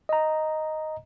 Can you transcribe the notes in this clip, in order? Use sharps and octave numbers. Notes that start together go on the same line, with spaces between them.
D#5 A#5